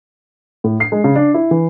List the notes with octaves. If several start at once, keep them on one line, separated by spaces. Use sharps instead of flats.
A2
C7
G#3
C#3
D4
E4
E3